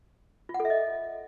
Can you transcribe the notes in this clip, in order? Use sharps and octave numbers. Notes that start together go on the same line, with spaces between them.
F4
F#5
A4
E5
D#5